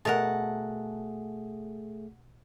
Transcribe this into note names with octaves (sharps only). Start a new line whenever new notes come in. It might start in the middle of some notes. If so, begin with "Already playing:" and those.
B2 A3 G#4 A#4 F#5 A5